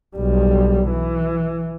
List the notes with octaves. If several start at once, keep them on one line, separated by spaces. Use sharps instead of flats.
B1 G3
E3